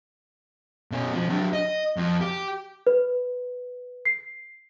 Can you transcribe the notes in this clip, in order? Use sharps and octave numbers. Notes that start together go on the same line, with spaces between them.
B2 C#4
F3 C4
F#3 D4
D#5
F2
G4
B4
C7